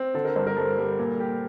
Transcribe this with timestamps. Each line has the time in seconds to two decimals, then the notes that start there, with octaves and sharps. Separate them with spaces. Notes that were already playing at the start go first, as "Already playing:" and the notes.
Already playing: C4
0.14 D3 A4
0.25 A#4
0.36 G2 C5
0.47 A#4
0.57 G2 A4
0.78 G3
0.99 A#2
1.20 G4